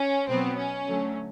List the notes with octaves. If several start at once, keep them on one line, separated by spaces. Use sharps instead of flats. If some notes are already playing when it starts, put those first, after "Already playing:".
Already playing: C#4
B2 F#3 B3 C4
C#4
D3 F#3 A3